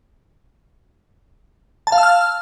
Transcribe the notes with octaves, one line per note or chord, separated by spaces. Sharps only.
A5
F5
E6
F6